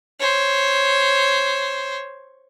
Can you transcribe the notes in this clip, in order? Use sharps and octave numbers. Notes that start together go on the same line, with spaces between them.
C5 C#5